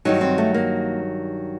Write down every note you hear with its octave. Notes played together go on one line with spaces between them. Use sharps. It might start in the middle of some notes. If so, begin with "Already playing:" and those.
G2 D#3 F#3 D#4
C4
A3
A#3